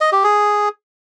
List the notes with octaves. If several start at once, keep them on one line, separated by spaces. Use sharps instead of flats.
D#5
G4
G#4